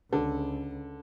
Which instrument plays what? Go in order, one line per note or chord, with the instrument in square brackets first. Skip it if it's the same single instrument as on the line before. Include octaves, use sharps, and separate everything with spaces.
[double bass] C#2 [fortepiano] D3